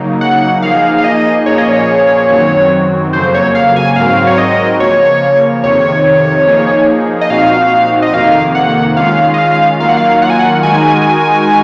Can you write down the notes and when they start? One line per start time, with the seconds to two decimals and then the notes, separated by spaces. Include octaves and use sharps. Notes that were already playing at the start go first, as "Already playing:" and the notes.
Already playing: C#3 F#3 A#3 D#4
0.21 F#5
0.62 F3 A#3 D#4 G#4 F5
0.98 F5
1.04 D#5
1.46 A#2 F3 A#3 C#4 G#4 C#5
1.58 D#5
1.69 C#5
2.29 F#2 D#3 F#3 C4 F#4
3.13 F2 C#3 F#3 A#3 C5
3.34 C#5
3.55 F5
3.76 G#5
3.96 G#2 F#3 C4 F#4 A#4 F5
4.27 C#5
4.38 D#5
4.80 C#3 F3 A#3 C#5
5.63 F2 C3 D#3 C#5
6.47 F3 A#3 D#4 G#4
7.21 D#5
7.30 A#2 F3 C4 D#4 F#4 F5
8.02 D#5
8.13 F2 C3 D#3 A#3 F5
8.55 F#5
8.96 D#3 G#3 C#4 F4 F5
9.34 D#5
9.38 F5
9.80 D#3 F#3 A#3 F4 A#4 F5
9.89 F#5
9.97 F5
10.22 F#5
10.30 G#5
10.39 F#5
10.63 D#3 G#3 D#4 F#4 A#4 G#5